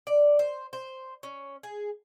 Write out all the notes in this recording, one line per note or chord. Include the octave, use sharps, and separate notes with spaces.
D5
C5
C5
C#4
G#4